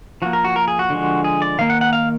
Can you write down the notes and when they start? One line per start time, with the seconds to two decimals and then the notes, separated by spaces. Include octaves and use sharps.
0.22 F3 A#3 F#4
0.33 A#4
0.44 F#4
0.56 A#4
0.68 G#4
0.79 F#4
0.90 D3 F3 G#3
1.24 G#4
1.42 D5
1.59 D#3 A#3 F5
1.70 F#5
1.81 F#5
1.93 F5